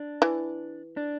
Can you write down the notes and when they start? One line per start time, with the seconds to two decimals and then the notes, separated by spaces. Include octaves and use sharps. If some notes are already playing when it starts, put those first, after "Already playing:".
Already playing: D4
0.22 E3
0.97 D4